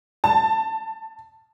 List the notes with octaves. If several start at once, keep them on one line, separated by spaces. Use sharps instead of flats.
A5